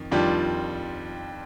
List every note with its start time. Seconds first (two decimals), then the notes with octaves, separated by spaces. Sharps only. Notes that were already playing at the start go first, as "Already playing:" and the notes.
Already playing: F2 D#3
0.11 F2 D#3 G3 D4 F4